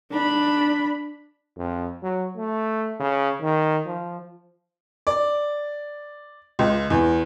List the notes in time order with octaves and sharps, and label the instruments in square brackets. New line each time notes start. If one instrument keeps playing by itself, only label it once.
[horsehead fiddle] D4 B5
[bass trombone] F2
F#3
A3
C#3
D#3
F3
[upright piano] D5
C#2
E2